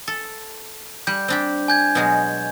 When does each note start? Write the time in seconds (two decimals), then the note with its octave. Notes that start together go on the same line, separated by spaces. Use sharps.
0.08 A4
1.07 G3 G6
1.28 C4 D4 G4
1.68 G#5 G6 G#6
1.95 B2 F#3 G#3